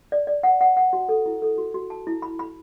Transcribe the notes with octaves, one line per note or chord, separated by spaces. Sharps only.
D5
D5
F#5
F#5
F#5
F#4
A4
E4
A4
F#4
F#4
A5
E4
B5
B5